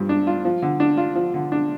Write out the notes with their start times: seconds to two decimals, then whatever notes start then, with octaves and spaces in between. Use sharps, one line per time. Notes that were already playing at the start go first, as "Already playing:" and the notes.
Already playing: G2 F3
0.09 D4
0.27 F4
0.45 F3
0.62 D3
0.80 D4
0.97 F4
1.15 F3
1.34 D3
1.52 D4